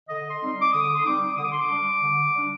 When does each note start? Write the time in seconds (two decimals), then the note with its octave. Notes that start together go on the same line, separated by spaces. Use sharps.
0.08 D3 D#5
0.30 C6
0.41 G3 C4 D#4
0.62 D6
0.73 D3 D#6
0.95 C6
1.05 G3 C4 D#4 D6
1.37 D3 D#6
1.45 D6
1.52 C6
1.60 D6
1.69 G3 D4
2.02 D3
2.34 G3 D4